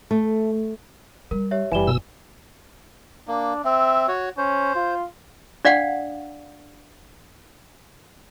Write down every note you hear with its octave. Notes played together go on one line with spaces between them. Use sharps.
A3
G3 A#4
G4 C#5 E5
F#1 E3 G3 G#5 E7 G7
B2 E6
A#3 D4
C4 E5
F#4 C#5
C#4 C5
F4
D4 D5 F5 F#5